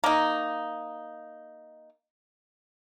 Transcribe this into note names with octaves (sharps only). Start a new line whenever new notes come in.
A#3 D#4